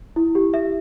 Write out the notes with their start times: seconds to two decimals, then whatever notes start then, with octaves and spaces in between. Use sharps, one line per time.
0.16 E4
0.35 G4
0.54 E5